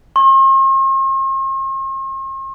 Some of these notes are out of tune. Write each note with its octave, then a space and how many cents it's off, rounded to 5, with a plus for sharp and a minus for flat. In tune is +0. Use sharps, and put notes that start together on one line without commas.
C6 +45